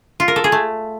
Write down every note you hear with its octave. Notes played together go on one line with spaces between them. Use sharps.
F4
A#4
A4
G#4
A3